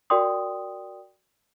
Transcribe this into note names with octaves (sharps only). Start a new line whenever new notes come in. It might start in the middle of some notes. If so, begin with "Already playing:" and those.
F#4 A#4 D5 G5 C6 D#6